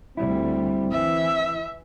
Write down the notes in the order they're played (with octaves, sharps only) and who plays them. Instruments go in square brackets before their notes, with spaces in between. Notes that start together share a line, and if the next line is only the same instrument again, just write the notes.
[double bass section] D2 G3 [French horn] C4 [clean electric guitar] E4
[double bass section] E3 [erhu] E5